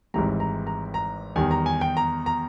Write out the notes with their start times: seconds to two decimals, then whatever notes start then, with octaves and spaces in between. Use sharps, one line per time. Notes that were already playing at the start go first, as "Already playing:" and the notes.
0.14 G#1 G#2 E3 G3 A#5
0.40 A#5
0.67 A#5
0.94 A#5
1.36 E2 D#3 G3 G#5
1.51 A#5
1.66 G#5
1.81 G5
1.97 A#5
2.26 A#5